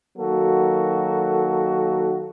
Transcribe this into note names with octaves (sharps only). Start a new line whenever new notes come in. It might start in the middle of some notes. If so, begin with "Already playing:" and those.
D#3 F#3 A#3 F#4 A4